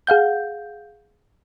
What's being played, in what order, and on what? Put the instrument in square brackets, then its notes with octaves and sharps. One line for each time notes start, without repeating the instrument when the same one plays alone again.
[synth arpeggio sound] G#4 F5 F#5 G6